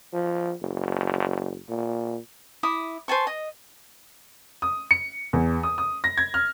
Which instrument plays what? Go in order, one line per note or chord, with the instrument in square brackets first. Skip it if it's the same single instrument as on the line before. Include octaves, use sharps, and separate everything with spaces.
[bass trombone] F3
F#1
A#2
[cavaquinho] E4 D6 D#6
C5 G#5 A5 C#6
D#5
[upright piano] D#6
C#7
E2
D#6
D#6
A#6
G#6
F6